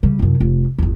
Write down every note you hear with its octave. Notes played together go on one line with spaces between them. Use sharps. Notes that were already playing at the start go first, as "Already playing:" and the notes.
C#3 G3
C2 F#2
F1
G1 E2